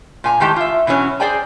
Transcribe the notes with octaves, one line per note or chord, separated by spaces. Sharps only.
A#2 G#5 A#5
A2 D#3 G#3 G4 G5 A5
F4 E5
B2 E3 F#3 C#4
G#4 C5 D5 G5 G#5 A#5